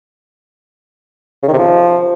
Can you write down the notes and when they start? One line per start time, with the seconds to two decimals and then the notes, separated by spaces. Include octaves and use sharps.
1.43 C#3
1.48 D#3
1.53 C3
1.58 F3